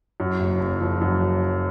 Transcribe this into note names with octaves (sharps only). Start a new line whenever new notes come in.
F#2
F#1
F#1
F3
F#2